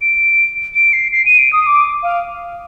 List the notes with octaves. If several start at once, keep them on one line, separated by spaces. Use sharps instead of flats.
D7
D7
C7
C7
D#7
D7
D#6
D6
F5